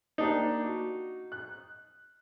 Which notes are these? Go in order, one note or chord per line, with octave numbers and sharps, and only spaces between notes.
A#3 D4 D#4 G4
F#4
F#6